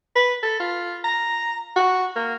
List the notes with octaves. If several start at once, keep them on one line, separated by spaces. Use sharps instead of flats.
B4
A4
F4
A#5
F#4
A#3